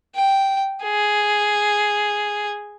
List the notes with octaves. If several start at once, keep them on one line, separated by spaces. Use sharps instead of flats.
G5
G#4